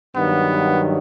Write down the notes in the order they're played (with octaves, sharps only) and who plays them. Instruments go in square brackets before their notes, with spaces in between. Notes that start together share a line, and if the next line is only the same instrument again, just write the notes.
[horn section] G2 D#3 F#3 B3